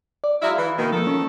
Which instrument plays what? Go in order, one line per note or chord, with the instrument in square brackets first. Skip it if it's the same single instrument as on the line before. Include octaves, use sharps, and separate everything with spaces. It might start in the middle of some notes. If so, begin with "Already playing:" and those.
[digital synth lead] D5
[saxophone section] F#3 G#3 E4 [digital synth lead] F5
[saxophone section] E3 [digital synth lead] B5
[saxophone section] B2 D#3 [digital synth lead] A#3
[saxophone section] D#3 A4 [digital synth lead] F3
[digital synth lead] C#4